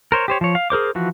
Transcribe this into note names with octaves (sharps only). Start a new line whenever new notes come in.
A#4 C5 C#5
G4 C5 C#5
F3 C#5
F5
G#4 A#4 C5 D6
E3 F3 F#4